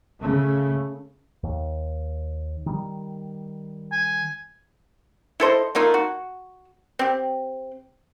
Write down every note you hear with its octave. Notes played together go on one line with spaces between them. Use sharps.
C#3 A3
D#2
D#3 G3
G#5
E4 A4 C5 D#5
A3 A#3 D#4 F4
F#4
C4 G4